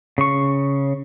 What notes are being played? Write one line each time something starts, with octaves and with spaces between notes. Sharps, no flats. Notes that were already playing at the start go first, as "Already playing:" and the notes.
C#3 C#6